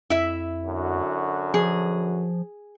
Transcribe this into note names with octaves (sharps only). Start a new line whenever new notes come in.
F2 E4 E5
F#2 D3 F#4
F3 G#4